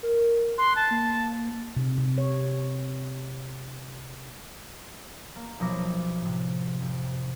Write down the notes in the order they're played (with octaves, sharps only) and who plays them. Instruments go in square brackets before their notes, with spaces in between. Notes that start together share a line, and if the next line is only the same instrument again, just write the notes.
[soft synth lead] A#4
[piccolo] C6 [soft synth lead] F#6
[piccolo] A5
[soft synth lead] A#3
[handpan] C3
C3
C#5
[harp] A#3
B1 F3 A4 D6 A#6
A2 C3
F2